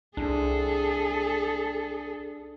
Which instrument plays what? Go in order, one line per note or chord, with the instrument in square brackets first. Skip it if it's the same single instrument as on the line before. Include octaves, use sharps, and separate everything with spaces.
[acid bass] C2 [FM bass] D4 [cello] G#4 A4